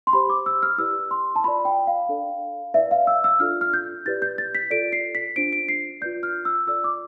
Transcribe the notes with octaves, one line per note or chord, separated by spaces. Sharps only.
C6
G4 C5 B5
D6
E6
F6
E4 G4 B4 D5 E6
C6
A5
F4 B4 D5 B5
G5
F5
D4 A4 D5
E4 B4 D5 E5
F5
E6
E6
D4 F4 A4 D5 F6
F6
G6
E4 G4 B4 D5 A6
G6
A6
B6
F4 A4 D5 D7
C7
B6
D4 F4 C5 D7
D7
C7
F4 B4 D5 G6
F6
E6
F4 A4 D5 E6
D6